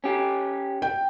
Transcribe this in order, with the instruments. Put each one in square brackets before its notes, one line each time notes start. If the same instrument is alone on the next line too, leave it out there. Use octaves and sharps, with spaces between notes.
[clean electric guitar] C#4 G4
[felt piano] G5